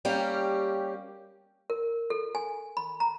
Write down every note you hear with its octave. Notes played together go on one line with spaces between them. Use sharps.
G3 A#3 C#4 G4
A#4
A4
G#5
B5
A#5